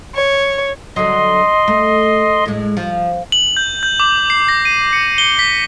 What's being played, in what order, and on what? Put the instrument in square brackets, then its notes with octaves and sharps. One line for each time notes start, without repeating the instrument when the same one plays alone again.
[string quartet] C#5
[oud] D3 F#3 [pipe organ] D#5 C6
[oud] A3
A2 G#3
F3
[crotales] F#7
G6
G6
D6
C7
A#6
D#7
C#7
G7
B6